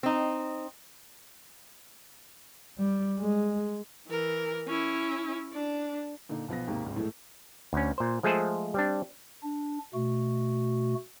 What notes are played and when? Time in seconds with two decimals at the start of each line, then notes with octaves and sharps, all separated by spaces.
0.03 C4 D#4
2.78 G3
3.19 G#3
4.08 E3 A#4
4.67 C#4 E4
5.52 D4
6.29 A#2 D3 D#4
6.48 B1 F3 B3 A#6
6.67 D#2 G#2 C3 A#3
6.84 G#1 C#2
6.96 A2 E3 G#3 A3
7.73 D2 C#4
7.98 A#2 C5
8.23 F3 G#3 A3 G#4 A4 C5
8.74 G3 C4 D4
9.43 D4
9.94 B2 A3 F#4